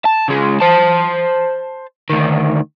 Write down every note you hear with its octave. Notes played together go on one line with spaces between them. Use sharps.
A5
C#3 G#3
C5 A5
D2 D#3